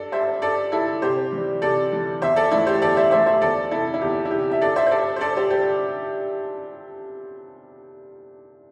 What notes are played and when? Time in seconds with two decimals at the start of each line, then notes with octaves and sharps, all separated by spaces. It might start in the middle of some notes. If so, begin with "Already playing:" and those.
Already playing: G2 A4 D5
0.12 G3 C5 E5
0.42 G2 A4 D5
0.72 G3 E4 A4
1.02 C3 G4 C5
1.32 E3 G3
1.62 C3 A4 D5
1.92 E3 G3
2.22 E2 C5 E5
2.36 A4 D5
2.51 E3 A3 E4 A4
2.67 G4 C5
2.82 E2 A4 D5
2.96 C5 E5
3.11 E3 A3 C5 E5
3.26 C5 E5
3.41 E2 A4 D5
3.71 C3 G3 E4 A4
3.94 E4
4.01 E2 G4
4.25 E4
4.31 C3 G3 G4
4.51 E5
4.61 G2 A4 D5
4.76 C5 E5
4.86 C5
4.91 G3 A4 D5
5.16 C5
5.21 G2 A4 D5
5.37 G4 C5
5.50 G3 G4